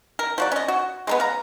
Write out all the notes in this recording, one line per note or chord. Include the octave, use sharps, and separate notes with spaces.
A#4
F3 F#4 D5
C#4 D#5
F#4
G#3 A#3 B3
F5 A#5